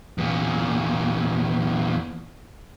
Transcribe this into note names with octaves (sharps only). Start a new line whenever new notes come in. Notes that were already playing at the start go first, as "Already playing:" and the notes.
E2 A#2